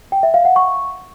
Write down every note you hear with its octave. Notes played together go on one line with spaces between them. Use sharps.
G5
E5
F5
F#5
C#6